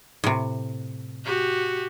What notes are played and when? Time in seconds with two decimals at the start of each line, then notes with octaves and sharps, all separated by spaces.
0.24 A2 C3
1.25 F#4 G4